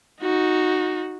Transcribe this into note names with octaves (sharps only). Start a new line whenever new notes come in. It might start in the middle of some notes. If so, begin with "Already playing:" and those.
D#4 F#4